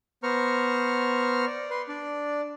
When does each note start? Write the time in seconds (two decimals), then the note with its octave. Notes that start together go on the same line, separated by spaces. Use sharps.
0.23 B3 C5 A#5 C#6 F6
1.47 D5
1.70 B4 C6
1.88 D4 D5